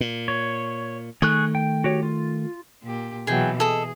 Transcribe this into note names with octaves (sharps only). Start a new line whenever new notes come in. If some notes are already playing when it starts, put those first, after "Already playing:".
A#2
C#5
D#3 A3 G#4 C#6 F#6
G5
F#4 G4 C#5
F4
A#2 G4
B2 E3 F#3 G#4 G5
G#4 A4 D#5